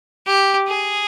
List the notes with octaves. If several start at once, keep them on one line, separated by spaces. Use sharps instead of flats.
G4
G#4